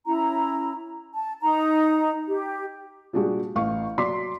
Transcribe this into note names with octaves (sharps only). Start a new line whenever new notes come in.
C#4 E4 A#5
A5
D#4 A#5
G4
A#2 G3 G#3 D4 F#4 G4
A1 F5 C#6
F#3 D5 C6 D6 B6